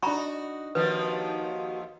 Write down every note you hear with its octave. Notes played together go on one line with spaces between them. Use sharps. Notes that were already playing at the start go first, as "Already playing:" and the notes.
D4 D#4 F#4 F#5 A#5 B5 C#6
D#2 D#3 F3 F#4 B4